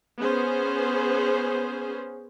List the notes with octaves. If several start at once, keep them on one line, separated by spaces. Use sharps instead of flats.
B3 C#4 G#4 C5